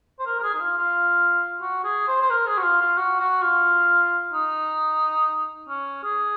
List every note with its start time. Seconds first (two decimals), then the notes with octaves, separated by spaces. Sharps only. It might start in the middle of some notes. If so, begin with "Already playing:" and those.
0.19 C5
0.26 A#4
0.39 A#4
0.43 G#4
0.54 D#4
0.60 F4
0.77 F4
1.62 F#4
1.84 G#4
2.07 C5
2.21 C5
2.30 A#4
2.47 G#4
2.58 F#4
2.63 F4
2.81 F4
2.97 F#4
3.20 F#4
3.42 F4
4.33 D#4
5.69 C#4
6.03 G#4